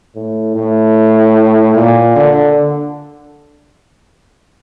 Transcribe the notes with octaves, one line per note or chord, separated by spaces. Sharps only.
A2
A2
A#2
D3